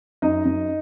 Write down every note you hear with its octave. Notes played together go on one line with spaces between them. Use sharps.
F#2 D#4 D#5
F#2